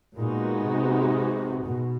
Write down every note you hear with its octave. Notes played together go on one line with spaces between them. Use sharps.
A#2 G#3 B3 D#4 F#4
C3
B2